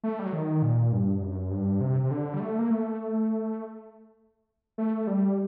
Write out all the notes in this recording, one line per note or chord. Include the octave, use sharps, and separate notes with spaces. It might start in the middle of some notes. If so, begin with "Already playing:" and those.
A3
G3
F#3
D#3
A#2
G2
F#2
G2
C3
C3
D3
G3
A3
A#3
A3
A3
G3